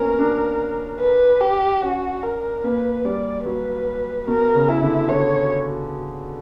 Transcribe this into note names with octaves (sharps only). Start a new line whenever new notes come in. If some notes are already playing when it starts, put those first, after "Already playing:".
Already playing: A#3 B3 C#4 A#4
D4
B4
G4
C#4 F#4
A#4
A#3 B4
G3 D5
F#3 B4
B2 A#4
C#3
E4
D3
D3 C#5